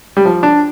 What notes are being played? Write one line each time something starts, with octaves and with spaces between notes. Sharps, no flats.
G3
F3
D4